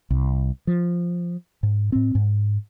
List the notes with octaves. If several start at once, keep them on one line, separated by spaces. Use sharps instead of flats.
C2
F3
G#2
A2 C4
G#2